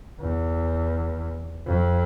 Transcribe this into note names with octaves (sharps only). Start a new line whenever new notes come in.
E2
F2